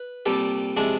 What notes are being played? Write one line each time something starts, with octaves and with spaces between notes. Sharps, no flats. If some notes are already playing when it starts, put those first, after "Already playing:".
Already playing: B4
C2 A#2 G3 G4 A4
C3 F3 G#3 D4 E4